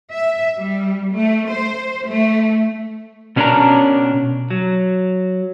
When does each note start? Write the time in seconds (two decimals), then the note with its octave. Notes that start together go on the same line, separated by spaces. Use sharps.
0.12 E5
0.56 G3
1.13 A3
1.50 C5
2.05 A3
3.36 B2 C#4 D4 A4 A#4 A#5
4.51 F#3